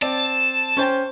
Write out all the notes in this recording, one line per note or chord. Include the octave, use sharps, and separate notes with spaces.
C4 D5 A5
C#4 C5 G5